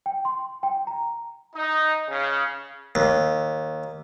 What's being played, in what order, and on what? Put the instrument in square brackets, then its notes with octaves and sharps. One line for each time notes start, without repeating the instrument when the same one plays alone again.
[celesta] G5
C6
G5
A#5
[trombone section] D#4
C#3
[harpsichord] D#2